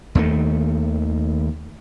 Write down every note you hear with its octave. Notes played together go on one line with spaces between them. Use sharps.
D#2 D#3 G3 A3